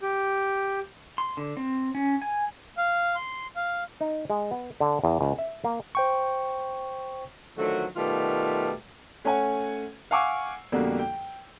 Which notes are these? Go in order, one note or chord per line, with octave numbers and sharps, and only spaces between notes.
G4
C6
D3
C4
C#4
G#5
F5
C6
F5
D#4
G#3
B3
D3
E2
C#2
E5
A#3
C5 G5 C#6
D3 D#3 F3 F#3 A3 F#4
B2 D#3 G3 A3 F4 F#4
A3 C#4 C#5 F#5 G#5
F5 F#5 G#5 C#6 D6 E6
F2 B2 D3 G3 A#3 F#4
G5